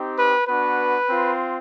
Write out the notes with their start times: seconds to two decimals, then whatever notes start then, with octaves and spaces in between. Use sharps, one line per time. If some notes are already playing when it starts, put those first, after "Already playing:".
Already playing: C4 D#4 G4
0.16 B4
0.47 B3 D4 F#4 B4
1.09 C4 F4